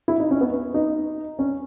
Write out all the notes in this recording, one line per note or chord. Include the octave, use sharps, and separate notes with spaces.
E4
D#4
C#4
B3
D#4
C#4